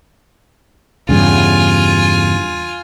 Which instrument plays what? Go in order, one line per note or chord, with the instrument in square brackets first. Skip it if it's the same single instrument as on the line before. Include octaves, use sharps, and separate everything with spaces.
[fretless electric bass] E2 G2 C#3 [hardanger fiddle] F4 G#5